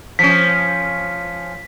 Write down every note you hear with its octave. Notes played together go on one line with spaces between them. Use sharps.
F3 C#4 B6